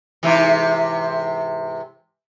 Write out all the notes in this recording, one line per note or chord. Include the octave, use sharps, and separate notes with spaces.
G#2 C3 E3